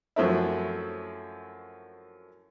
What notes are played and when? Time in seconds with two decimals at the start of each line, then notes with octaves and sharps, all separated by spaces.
0.16 F#2 F3 F#3 A3 C4 E4